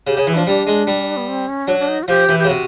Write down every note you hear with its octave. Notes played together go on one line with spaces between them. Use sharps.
C#3 G4
C#3
G#4
E3
F3 D4
G3 D4
G#3
G3
B3
C4
C#4
F#3 D4
D4
D#4
F#4
F3 G4
E3
G4
C#3
C3 F#4